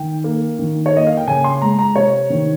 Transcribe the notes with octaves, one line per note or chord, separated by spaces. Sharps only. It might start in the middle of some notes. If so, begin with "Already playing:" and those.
Already playing: D#3 G5
A#3
D#3
C#5
A#3 D#5
F5
G5
C#3 G#5
C6
G#3 A#5
A#5
C3 C#5
D#3